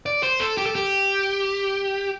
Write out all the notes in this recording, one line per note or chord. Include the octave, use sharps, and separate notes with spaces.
D5
C5
A4
G4
A4
G4